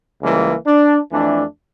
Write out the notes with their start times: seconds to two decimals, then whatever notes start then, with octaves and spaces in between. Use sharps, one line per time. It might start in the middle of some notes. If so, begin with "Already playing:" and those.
0.22 C#2 C#3 E3 G3 A#3
0.67 D4
1.11 F2 E3 A3 D4